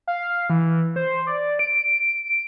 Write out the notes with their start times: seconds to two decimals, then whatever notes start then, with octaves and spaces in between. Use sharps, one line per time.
0.07 F5
0.50 E3
0.96 C5
1.27 D5
1.59 D7
2.27 D7